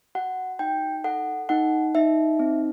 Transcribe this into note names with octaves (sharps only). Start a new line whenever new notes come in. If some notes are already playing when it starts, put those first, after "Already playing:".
F#4 F#5
D#4 G5
A4 F#5
D#4 F#5
D#4 E5
C4